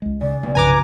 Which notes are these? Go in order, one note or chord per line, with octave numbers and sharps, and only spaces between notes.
C#2 G#3
C#3 D5
B1 A3 B3
C2 G2 F3 B4 G#5 A#5 D6